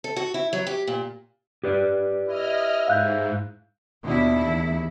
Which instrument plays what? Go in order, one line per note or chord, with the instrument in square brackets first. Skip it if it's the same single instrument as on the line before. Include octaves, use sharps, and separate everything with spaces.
[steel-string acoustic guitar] A4
F#4
E4
F#3
G4
A#2
[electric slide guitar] G4 B4 D5
[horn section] E4 [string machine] D#5 F6
[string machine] G#2 [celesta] F5 F#6 G6
[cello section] D#2 E4 [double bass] B2 D4
[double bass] E2